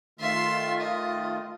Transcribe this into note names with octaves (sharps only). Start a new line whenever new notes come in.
D#3 A3 F4 E5 C6
D#5